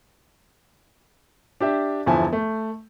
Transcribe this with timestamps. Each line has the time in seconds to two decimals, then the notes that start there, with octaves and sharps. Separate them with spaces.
1.61 D4 G4 E5
2.06 G1 E2 F3 E4 G#5 A5
2.33 A3